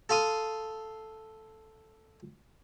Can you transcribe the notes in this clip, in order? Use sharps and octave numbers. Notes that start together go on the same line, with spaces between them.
A4 F5 C6 D#6